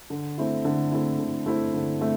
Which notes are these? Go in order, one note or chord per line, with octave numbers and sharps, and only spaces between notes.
D3
A3 C4 E4
D3
A3 C4 E4
D3
A3 C4 E4
D3
A3 C4